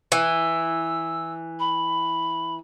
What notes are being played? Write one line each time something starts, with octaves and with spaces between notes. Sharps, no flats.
E3 E6
B5